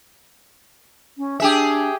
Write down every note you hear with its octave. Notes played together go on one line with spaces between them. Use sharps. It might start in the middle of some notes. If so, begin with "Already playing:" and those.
C#4
D4 G4 G#4 E5